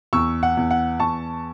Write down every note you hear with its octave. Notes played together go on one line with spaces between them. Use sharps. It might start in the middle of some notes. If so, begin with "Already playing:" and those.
E2 C#6 E6
F#5
E2
F#5
E2 A5 C#6